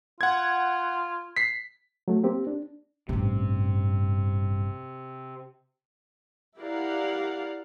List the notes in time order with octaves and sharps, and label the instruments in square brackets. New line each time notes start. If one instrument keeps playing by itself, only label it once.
[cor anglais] F4 [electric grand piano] F#5 G#6
[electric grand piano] B6 C7
[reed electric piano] F#3 A3
A#3 C4 G4
D4
[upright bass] A1 G2 [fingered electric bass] C3
[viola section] E4 G4 A#4 D5 F5 F#5